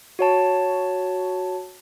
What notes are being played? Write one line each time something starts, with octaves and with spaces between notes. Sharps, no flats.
F#4 C#5 A5